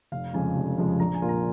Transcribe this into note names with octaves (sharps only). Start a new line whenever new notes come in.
F1 F5
F2 C#3 F3 G#3 G#5
F1
F2 C#3 F3 G#3
A#1 A#5
G#5
A#2 A#3 F4
A#5